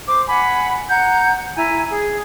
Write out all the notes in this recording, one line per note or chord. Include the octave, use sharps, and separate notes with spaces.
C5 D6
F#5 G#5 B5
F#5 A#5 G6
E4 G#5 A#5
G#4